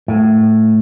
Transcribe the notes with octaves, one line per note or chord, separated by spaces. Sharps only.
A2